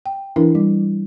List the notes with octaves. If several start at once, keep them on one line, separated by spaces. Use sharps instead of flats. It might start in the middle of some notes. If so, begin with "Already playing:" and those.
G5
E3 D4 E4 A#4
G3